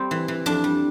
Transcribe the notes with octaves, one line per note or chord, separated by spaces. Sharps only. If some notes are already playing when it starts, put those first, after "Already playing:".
Already playing: G3 C4
E3
E3
F2 D4
G3